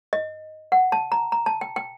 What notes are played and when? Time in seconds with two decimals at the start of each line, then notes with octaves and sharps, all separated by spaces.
0.13 D#5
0.72 F#5
0.92 A5
1.12 A#5
1.32 A#5
1.46 A5
1.61 G5
1.76 G5